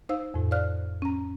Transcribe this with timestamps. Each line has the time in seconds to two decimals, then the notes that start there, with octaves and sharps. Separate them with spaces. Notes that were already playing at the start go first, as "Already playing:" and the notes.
0.09 D#4 C5 F5 E6
0.34 F2 A2
0.51 C5 D5 F5 F6 F#6
1.02 C#4 A#5